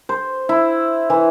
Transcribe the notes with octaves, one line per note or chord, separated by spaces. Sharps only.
C5
E4
E3